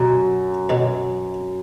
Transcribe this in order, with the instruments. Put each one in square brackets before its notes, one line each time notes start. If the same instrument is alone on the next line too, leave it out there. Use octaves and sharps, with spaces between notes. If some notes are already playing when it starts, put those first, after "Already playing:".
Already playing: [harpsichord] B1 B2 F#3 [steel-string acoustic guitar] F#2
[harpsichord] B1 B2 F#3